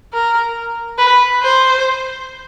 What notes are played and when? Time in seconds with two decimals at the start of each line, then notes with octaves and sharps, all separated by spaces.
0.13 A#4
0.99 B4
1.43 C5